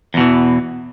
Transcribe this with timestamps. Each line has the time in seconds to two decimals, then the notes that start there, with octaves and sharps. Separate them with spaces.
0.14 E2
0.17 B2
0.20 E3